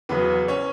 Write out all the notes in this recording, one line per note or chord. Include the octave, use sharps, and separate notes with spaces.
E2 C#3 F#3 B3 B4
C#4 C#5